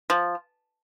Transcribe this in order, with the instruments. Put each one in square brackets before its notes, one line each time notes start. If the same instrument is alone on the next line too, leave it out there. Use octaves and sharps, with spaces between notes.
[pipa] F3